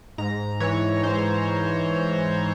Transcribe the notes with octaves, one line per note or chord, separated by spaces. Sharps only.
G#2 A#5
E3 C#5
G#2 C5